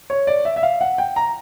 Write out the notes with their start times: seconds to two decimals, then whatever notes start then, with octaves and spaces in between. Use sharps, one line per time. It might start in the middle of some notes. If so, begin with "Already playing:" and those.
0.10 C#5
0.27 D5
0.45 E5
0.56 E5
0.63 F5
0.81 F#5
0.98 G5
1.16 A#5